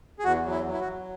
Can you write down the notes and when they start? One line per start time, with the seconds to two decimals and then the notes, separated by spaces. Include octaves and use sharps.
0.19 G#4
0.24 E2 F#4
0.46 F#3
0.51 E4
0.66 F#3
0.73 E4
0.80 F#4
0.86 F#3